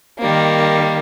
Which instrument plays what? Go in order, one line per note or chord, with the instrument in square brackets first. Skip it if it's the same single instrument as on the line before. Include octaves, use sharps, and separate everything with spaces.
[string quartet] D#3 G3 A#3